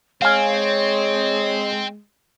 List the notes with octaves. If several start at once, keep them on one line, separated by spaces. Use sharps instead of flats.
G#3 C4 C#5 F5 G#5